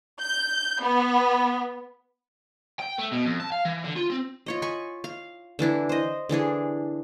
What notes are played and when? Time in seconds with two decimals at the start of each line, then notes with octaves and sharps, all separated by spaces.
0.21 G6
0.82 B3
2.80 G5
2.99 A3
3.12 B2
3.25 F2
3.40 A5
3.52 F5
3.65 E3
3.84 D3
3.96 F4
4.10 C4
4.46 F4 C#5 D#5
4.62 G#5 B5 C#6
5.04 F5
5.59 D3 E3 D4 E4
5.89 C5 D#5
6.29 D3 E3 D4 G#4